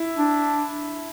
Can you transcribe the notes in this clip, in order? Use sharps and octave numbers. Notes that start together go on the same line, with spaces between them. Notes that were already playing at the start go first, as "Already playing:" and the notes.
Already playing: E4
D4